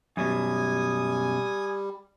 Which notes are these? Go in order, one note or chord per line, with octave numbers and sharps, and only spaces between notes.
F#2 B2 G3 G#5 D#6